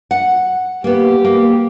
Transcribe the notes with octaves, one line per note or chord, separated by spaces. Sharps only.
F#5
A#3 B3 G4
A#3